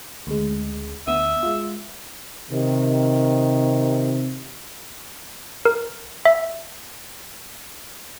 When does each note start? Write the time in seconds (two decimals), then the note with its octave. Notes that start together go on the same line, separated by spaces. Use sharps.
0.27 D2 C#3 G#3
1.07 D2 B3 E5 D#6
1.43 G#3 F4
2.49 C3 D#3
5.65 A#4
6.25 E5